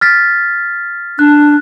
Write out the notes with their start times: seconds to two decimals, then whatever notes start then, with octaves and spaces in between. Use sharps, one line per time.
0.01 F6 A6 B6
1.19 D4 F#6